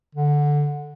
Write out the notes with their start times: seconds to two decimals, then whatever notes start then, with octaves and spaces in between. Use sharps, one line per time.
0.15 D3